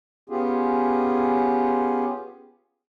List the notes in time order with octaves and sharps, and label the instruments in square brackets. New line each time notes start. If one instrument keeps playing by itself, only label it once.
[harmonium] B3 C#4 F4 G4 G#4